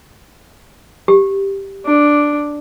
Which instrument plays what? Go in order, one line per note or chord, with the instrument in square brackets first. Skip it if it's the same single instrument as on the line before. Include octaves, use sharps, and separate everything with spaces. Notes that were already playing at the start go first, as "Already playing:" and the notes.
[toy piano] G4
[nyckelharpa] D4